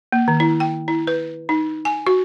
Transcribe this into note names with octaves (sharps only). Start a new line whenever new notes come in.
A#3
D#3
E4
G5
E4
B4
D#4
G#5
F#4